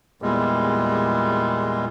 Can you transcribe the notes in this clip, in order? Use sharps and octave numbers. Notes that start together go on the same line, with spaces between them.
E2 A#2 G3 G#3